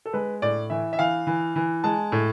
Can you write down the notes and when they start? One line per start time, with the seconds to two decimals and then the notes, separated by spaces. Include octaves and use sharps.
0.06 A4
0.13 G#3 B4
0.42 A2 D5
0.70 E3 E5
0.93 E5
0.99 E3 F5
1.27 E3
1.56 E3
1.84 G#3 A5
2.12 A2